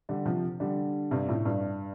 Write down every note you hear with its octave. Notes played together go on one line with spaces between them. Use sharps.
D3 G3
C3 F3
D3 G3
G2 C3
A2
G2